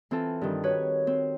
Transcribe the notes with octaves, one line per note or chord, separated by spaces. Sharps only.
E3 C4 F4 A4
G2 D#3
F#4 B4 C#5
C4